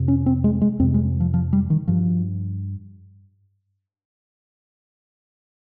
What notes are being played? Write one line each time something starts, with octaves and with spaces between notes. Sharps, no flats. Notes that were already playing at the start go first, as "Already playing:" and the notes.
Already playing: F2 C3
C#4
C4
G#3
G#3
F2 C3 C4
G#3
F3
F3
G3
D#3
G2 F3